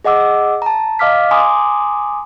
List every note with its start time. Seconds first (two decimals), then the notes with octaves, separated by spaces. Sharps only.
0.05 G#4 D#5 F#5 D6 E6
0.62 A5 A#5
0.99 D#5 F5 D6 F6 B6
1.31 G#5 A#5 C6 D6 D#6